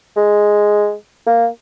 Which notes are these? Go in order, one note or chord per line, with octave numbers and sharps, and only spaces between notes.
G#3
A#3